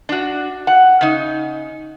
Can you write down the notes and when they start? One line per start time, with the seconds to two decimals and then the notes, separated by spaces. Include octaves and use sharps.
0.09 D4 F#4
0.67 F#5
1.01 C#3 D#4